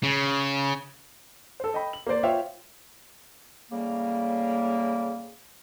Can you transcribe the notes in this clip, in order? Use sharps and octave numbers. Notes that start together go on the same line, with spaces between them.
C#3
A4 C5
D#5 G5 B5
F#7
A#3 A#4 C5 D5
F4 C5 C#5 E5 F5 G5
A2 C#3 G3 A#3